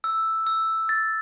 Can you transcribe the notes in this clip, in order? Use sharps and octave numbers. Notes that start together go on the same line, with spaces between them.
E6
E6
A6